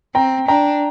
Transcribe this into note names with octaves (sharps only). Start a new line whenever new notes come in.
C4 G5 A#5
D4 G5 A#5